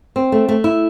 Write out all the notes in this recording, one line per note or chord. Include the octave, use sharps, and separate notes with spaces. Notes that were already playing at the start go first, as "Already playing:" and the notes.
C4
A3
A3
E4